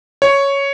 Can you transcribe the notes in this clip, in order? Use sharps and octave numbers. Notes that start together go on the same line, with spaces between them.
C#5